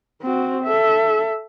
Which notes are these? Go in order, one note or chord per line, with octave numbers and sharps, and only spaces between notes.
C4 F#4
A4 E5